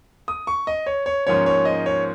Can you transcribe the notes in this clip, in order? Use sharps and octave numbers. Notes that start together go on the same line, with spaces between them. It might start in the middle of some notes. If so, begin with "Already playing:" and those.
D#6
C#6
D#5
C#5
C#5
G#2 F3 A#3 C#4 C#5
C#5
D#5
C#5